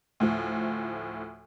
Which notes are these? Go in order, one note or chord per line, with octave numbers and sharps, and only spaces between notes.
D2 A2 F3